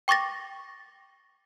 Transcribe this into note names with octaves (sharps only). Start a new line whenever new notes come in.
G5 C#6 D6 A6 A#6